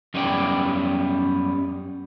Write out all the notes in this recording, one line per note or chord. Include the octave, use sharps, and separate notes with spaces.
F#2 G3 B3 C#4 D5 G5